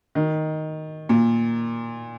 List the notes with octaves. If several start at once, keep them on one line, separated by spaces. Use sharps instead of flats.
D#3
A#2